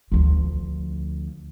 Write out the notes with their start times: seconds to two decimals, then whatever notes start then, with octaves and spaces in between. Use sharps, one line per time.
0.12 D2 F3